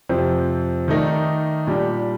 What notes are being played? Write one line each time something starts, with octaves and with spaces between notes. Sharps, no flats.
F2 C3 F3 C4
D#3 A3 D#4 A#4 D5
A#2 G3 D4 G4